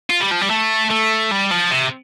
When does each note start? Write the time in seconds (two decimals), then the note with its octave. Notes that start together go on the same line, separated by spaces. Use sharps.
0.10 F4
0.21 G3
0.31 F3
0.41 G3
0.50 A3
0.91 A3
1.31 G3
1.51 F3
1.71 C3